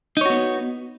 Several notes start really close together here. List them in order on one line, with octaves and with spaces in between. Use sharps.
D#4 C#5 F#4 B3